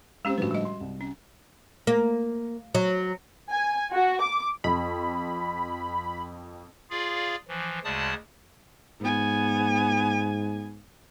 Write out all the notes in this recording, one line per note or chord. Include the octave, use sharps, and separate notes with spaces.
G#3 C4 C#4 G4 E7
A2 D3 F3 F#4 B4
G3 D#5
C6
C2
C#4
A#3
F#3
G#5
F#4
D6
F2 B5
F4 G#4 D5 F5
E3 F3
D2 C#3 G#3 D5 A5 D#6
G#2 B3 G#5